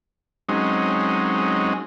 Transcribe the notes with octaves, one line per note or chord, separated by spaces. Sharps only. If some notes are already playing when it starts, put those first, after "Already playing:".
F#3 G#3 C4 C#4 D#4